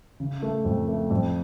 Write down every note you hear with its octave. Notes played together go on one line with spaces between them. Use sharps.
C#3
A3
F2
A3
F2